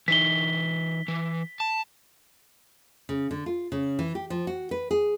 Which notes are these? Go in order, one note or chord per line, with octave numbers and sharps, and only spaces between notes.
E3 D#4 B6 G7
E3
A5
C#3
D3
F4
C#3
E3
G4
F3
F#4
B4
G#4